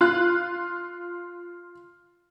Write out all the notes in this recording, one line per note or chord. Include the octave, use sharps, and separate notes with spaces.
F4 F#6